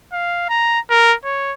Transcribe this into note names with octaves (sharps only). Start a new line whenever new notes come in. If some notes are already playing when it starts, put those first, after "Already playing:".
F5
A#5
A#4
C#5